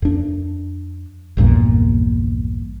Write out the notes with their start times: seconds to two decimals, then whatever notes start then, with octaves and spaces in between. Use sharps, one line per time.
0.02 F2 D4
1.37 A#1 E2 G2 A#2